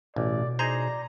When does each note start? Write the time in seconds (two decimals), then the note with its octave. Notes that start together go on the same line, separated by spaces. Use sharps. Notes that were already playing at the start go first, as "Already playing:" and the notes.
0.16 A1 B2 D5
0.59 D#4 G#4 C5 D5 A#5